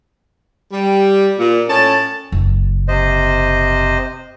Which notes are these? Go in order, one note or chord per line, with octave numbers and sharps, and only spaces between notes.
G3
A#2
A2 C#4 A5
F#1
C3 C5 D#5